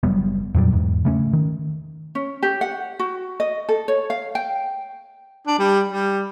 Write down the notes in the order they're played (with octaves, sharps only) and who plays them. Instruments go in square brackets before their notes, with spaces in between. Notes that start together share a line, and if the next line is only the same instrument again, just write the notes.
[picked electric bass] F#1 F#3 G3 B3
F2 A#2 F#3 G3
E2 G#2
C#3 A3 C#4
D#3
[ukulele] C#4
G4
F#5
F#4
D#5
A4
C#5
F5
G5
[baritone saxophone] D4
G3
G3